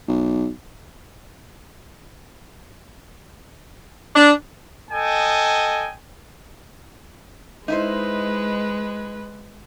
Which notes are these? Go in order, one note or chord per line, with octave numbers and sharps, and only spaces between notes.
B1
D4
A4 D#5 G5 G#5
G#3 D#4 E4 B4 C5